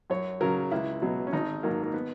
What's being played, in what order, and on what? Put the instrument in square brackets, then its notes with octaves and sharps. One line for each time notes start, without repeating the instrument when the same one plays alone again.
[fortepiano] F#2 C#5
C#3 F#3 A#4
C#2 E4
B2 F#3
C#4
G#1 D#4
G#2 D#3 F#3 A#3
A#3
B3